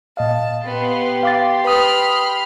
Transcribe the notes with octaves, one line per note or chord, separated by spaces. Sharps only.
A#2 D#5 F5 A5
B3 G4 C6
F5 D6 A6
B4 B5 D#6 F6